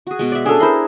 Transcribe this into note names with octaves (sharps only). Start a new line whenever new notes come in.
F#4 G#4
B2 G#3
D5 E5
C#4 D4 G#4 A4
E4 A#4 C5 C6